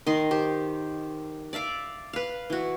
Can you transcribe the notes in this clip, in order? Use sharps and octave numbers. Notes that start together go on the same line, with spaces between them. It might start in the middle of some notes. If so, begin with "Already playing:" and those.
D#3 D#5 C6
G4 C5
D5 E5 F5 D6
B4 F5
E3 F#4